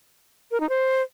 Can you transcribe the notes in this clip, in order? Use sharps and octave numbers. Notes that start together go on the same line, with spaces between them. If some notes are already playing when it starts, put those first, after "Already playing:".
A#4
D#4
C5